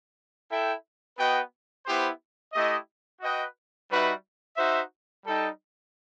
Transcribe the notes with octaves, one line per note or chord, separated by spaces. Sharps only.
E4 A4 E5 G5
B3 F#4 B4 D#5 G5
B3 E4 G4 C5
A3 E4 G4 D#5
F#4 B4 D#5 G5
G3 D#4 F#4 B4 E5
D#4 F#4 C5 E5
G3 D#4 A4 D#5 G5